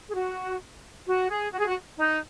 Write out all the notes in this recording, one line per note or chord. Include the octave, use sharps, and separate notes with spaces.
G#4
F#4
F#4
G#4
F#4
G#4
F#4
D#4